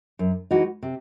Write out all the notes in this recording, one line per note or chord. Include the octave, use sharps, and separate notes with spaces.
F#2
E3 G#3 D#4 F#4
C3